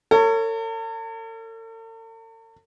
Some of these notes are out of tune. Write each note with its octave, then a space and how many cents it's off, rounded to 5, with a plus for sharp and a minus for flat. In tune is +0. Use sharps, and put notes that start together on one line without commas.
A4 +45 C#5 +0